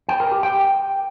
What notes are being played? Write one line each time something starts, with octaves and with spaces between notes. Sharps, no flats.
G5
A#4
G4
G5